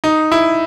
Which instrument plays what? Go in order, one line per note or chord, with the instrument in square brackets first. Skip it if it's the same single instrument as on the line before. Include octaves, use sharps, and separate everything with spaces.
[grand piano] D#4
E4